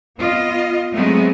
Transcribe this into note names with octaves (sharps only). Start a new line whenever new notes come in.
B3 F4 D#5
F#3 G#3 A3 B3 C4